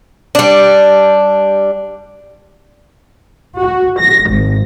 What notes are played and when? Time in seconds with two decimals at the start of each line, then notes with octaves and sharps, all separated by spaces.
0.35 G3 D4
3.58 F#4
3.99 A#6
4.29 G#1